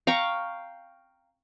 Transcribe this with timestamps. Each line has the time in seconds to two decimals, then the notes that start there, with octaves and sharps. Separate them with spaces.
0.07 F5 G5 A#5 C#6